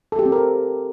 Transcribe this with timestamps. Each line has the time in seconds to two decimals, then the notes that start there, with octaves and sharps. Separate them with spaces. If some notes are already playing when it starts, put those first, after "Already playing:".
0.12 A4
0.19 G4
0.26 C4
0.32 A#4